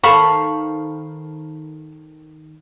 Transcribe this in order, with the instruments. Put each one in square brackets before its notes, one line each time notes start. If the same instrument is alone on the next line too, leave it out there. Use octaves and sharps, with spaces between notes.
[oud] D#3 A4 C5 [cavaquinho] F5 B5 C#6